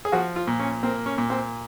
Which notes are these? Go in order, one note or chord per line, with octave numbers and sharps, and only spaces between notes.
G#4
F3 F#4
F4
A#2
C#4
A#3 C4
C#4
A#2
C4